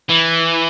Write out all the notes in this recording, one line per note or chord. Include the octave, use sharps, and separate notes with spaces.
E3